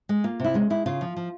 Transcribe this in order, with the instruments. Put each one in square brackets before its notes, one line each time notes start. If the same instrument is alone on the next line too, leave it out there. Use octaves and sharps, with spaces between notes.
[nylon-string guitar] G#3
A#3 F4
C3 E4
G#3 C#4
G#3 E4
C#3 F4
F3
F3